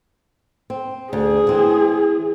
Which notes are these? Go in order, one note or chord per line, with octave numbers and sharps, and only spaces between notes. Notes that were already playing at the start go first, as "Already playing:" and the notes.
C4
D2 G#4
E3 C4